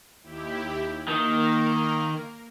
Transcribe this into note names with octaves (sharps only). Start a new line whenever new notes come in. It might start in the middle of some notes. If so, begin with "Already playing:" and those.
D#2 E4 G4
D#3 A#3 A#4